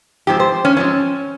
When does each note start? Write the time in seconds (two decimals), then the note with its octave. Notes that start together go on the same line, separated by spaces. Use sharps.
0.27 G#2 F3 C4 G4
0.40 C5
0.65 C#4
0.77 G#2 F3 C4 C#4